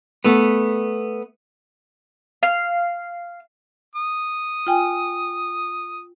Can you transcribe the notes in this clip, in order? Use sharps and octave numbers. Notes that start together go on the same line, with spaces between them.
A3 B3
F5
D#6
F4 G5 G#5